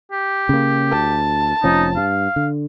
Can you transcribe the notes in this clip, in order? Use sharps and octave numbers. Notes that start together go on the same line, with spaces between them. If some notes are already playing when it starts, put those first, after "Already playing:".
G4
C#3 A#3
D2 A5
F1 F3 C#4 D#4
G2 F5
D3